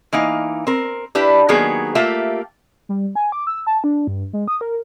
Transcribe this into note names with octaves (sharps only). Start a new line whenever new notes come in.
E3 A#3 D#4 F5
C4 A#4
D4 E4 G4 B4
D#3 F#3 A#3 B3 G#4
A3 A#3 F4 G4 E5
G3
G#5
D6
E6
A5
D4
G2
G#3
D#6
A#4